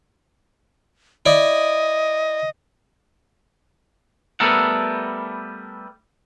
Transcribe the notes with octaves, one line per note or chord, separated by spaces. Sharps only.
E4 D5 D#5
G3 A3 B3 A4 A#4 F#5